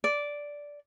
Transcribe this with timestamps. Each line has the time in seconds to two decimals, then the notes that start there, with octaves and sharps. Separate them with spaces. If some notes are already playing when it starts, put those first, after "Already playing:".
0.04 D5